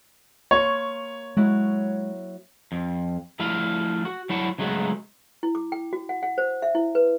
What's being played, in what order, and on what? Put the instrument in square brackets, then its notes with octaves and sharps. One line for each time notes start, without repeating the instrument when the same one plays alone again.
[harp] A#3 C6 C#6 [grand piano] C#5
[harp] F#3 E4 [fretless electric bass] G#3
[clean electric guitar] F2
F3 A3 E4 D5 F5
F#4
F#3 G3 E4 C#5 F#5 A5
C#3 F#3 G#3 A3 B3 F#4
[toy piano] E4
D6
G5
F#4
F#5
F#5
C5
E5
E4
B4